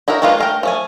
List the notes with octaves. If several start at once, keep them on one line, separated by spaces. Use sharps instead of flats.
D#4 E4 F#4 A#4
E3 G#3 A#3 D4 F4
A3 A#4 G5
F3 A3 G#5